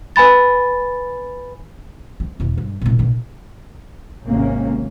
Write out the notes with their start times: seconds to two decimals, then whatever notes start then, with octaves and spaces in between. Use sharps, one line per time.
0.16 B4 G#5 B5 A6
2.20 C4
2.40 E1 E2
2.57 G2
2.81 C2 A#2
2.99 A#1 B2
4.25 G#1 C#2 C3 A#3 C#4